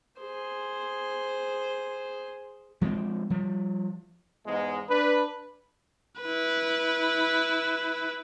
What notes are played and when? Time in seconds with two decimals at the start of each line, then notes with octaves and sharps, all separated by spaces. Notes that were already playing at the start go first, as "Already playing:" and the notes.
0.21 G#4 C5
2.81 F3 G#3 B3 C4
3.30 F3 G3
4.46 E2 G#2 G#3
4.89 D4 B4
6.21 E4 B4